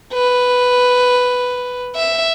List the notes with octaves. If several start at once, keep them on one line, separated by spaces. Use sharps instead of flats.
B4
E5